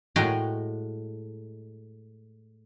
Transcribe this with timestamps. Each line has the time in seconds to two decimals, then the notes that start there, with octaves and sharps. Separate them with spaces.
0.16 A2 G#3 F#4 G5 G#5 A#5